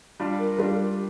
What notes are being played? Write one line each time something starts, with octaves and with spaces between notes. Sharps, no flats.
G3 D4 F4
A#4
G3 D4 F4 G4